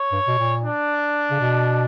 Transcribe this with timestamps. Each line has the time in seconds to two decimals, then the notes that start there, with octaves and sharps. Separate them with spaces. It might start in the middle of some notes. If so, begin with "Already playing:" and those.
Already playing: C#5
0.12 G2
0.27 B2
0.38 A#2
0.63 D4
1.31 C#3
1.40 B2